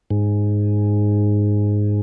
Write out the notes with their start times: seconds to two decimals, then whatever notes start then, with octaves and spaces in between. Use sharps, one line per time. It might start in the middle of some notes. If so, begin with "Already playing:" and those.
0.10 G#2